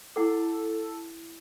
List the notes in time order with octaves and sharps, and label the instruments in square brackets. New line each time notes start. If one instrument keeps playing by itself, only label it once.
[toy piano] E4 F#5 D6 [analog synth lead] A4